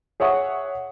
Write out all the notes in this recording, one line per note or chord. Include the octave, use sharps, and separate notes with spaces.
G#4 C#5 E5 F#5 C#6 D#6